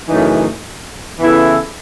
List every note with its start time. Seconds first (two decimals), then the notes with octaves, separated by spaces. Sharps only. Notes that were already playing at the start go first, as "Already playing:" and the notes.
0.08 F#2 C#3 E3 A3 D#4
1.19 C#3 E3 B3 E4 A4